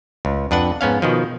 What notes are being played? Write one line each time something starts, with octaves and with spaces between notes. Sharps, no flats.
C#2
F2 D4 B4 F#5
G#2 B3 C#4 F5
B2 D#3 F3